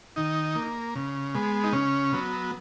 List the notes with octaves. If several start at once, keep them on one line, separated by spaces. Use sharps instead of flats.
D#3 D#4
A#3
C#3
G#3 B3
D#4
C#3 C#4
F#3 B3